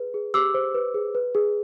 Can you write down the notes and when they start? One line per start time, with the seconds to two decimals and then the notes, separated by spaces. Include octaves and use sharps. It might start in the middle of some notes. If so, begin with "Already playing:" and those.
Already playing: G#4 B4
0.14 G#4
0.34 G4 D6 E6
0.54 C5
0.74 B4
0.94 G#4
1.15 B4
1.35 G#4